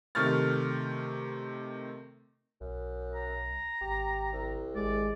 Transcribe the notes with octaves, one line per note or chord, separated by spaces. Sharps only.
C3 D#3 A3 C#6 F6 A6
B1 F#2
A#5
G#1 G4
C2
G#1 G#3 D5